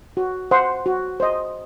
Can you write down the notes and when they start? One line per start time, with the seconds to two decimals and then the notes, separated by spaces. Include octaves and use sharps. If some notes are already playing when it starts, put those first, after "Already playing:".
0.17 F#4
0.51 C5 F#5 C6
0.86 F#4
1.20 C5 D#5